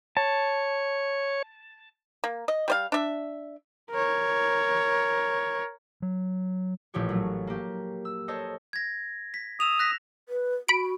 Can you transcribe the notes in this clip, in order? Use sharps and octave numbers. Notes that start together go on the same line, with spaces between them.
C#5 A5
A#3
D#5
G3 C5 F5
D4 E5
A#4 C#5
F#3
A1 A#2 F3 G4 C#5
F#3 A3
A#3 G4
E6
A4 C5 C#5 D#5
G#6 A#6
B6
D#6 E6 E7 F7
F#6 A#6 B6
B4
F#4 B5 D7